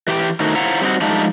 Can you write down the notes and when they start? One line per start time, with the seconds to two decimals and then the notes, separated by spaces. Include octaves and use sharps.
0.08 E3 G4 E5 G5
0.40 D#3 A3 D#4 F#4 C5
0.55 E4 F4 C5 E5 F#5 A#5
0.81 G3 C4 D#4 F#4
1.01 F3 G#3 A3 D4 D#4 G4